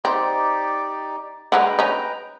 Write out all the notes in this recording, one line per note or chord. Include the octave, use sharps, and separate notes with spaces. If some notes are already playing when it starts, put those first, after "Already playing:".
C4 D#4 G4 D5
D3 F#3 G#3 B4 G5 A#5
C#4 D#4